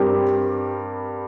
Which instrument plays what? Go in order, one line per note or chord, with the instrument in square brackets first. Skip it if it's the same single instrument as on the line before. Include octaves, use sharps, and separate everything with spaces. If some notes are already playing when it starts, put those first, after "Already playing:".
Already playing: [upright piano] G2 G3 C4 G4 A#4